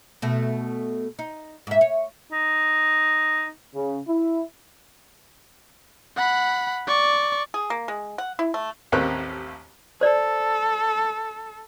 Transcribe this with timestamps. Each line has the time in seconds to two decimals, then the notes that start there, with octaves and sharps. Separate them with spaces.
0.22 B2 A3
1.19 D#4
1.67 G#2 E5
1.81 C#5
2.32 D#4
3.75 C#3
4.08 E4
6.16 F#5 B5
6.87 D5 C#6
7.54 G#4
7.70 A#3
7.88 G#3
8.18 F#5
8.39 E4
8.54 A3
8.92 A1 D#2 A#3 C4 F#6
10.01 A4 C5 D5